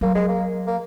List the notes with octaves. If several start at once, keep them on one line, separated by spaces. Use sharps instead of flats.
F#3 A#3
G#3
A#3
A#3